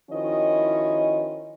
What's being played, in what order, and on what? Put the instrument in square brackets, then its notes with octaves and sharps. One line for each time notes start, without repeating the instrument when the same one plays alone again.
[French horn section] D#3 F3 C#4 E4 F#4 D#5